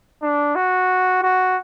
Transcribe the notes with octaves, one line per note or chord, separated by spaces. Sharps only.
D4
F#4
F#4